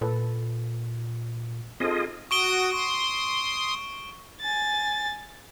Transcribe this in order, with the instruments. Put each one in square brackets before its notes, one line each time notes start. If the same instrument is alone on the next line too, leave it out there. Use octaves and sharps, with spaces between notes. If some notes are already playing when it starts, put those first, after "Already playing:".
[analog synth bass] A#2 [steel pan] A4 B4
[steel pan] C4 D#4 A4 [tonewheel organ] F4 G#4 D#5
[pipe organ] F#4 D#6 [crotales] C#6 D7 G7
[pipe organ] C6 D#6
[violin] G#5 A6